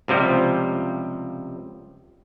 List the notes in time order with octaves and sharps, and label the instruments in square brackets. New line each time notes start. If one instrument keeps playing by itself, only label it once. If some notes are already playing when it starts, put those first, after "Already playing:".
[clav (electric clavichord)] C#2 C3 F3 G3